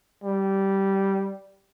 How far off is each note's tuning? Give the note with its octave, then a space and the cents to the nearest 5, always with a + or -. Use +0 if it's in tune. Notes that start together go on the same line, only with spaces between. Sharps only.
G3 -10